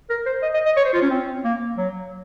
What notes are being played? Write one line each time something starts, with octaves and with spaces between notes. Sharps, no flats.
A#4
C5
D#5
D#5
D#5
C#5
C5
F4
C#4
C4
A#3
F#3